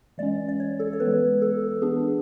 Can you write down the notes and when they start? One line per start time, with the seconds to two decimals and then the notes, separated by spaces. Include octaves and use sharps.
0.18 E3 G#3 C#4 D5
0.48 D5
0.60 C#5
0.80 A4
0.93 C#5
1.00 E3 G#3 B3 B4
1.42 A4
1.82 E3 B3 D4 G#4